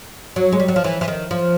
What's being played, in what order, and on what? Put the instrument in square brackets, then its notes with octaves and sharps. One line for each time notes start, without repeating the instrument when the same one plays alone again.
[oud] F#3
G#3
G3
F#3
F3
E3
E3
D#3
F3